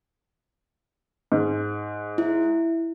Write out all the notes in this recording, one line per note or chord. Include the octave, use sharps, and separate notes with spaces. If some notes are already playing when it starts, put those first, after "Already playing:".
G#2
E4